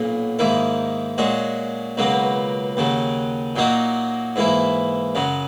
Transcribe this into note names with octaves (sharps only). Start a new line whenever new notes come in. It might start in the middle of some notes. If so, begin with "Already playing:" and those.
Already playing: B1 A#2 A#3 C#4
G#2 D#3 A#3 E4
A#2 G#3 C#4 F#4
C#2 B2 F#3 A#3
D#2 C#3 F#3
A#2 F#3 A#3 D#4 F#4
G#2 E3 A#3 E4
F#2 C#3 F#3